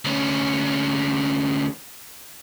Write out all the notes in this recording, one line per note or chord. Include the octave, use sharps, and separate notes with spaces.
D2 C#4